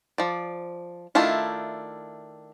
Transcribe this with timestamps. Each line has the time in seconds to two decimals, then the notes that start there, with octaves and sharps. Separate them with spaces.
0.18 F3 D5
1.15 D#3 A3 D4 E4 F4